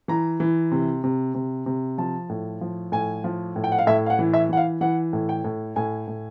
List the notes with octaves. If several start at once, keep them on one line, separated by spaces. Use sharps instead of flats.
E3 A#5
E3
C3
C3
C3
C3
F3 A5
A2
F3
A2 G#5
F3
A2
G5
F#5
F5
A2 E5
F5
F#5
E3
E5
E3 F#5
F5
E3 F#5
A2
G5
A2
A2 G#5
A2